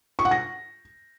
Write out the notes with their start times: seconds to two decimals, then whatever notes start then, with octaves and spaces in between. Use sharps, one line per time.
0.19 C#6
0.25 F#5
0.31 A#6